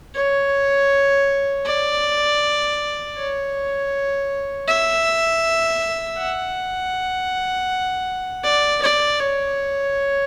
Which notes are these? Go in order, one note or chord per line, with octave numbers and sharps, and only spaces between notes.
C#5
D5
C#5
E5
F#5
D5
D5
C#5